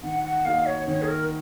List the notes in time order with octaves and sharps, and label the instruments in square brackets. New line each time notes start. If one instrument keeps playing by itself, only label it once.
[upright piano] D#3 [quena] F#5
[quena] F#5
[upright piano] A#3 D#4 F#4 [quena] F5
[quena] C#5
[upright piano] D#3 [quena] C#5
[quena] G#4
A#4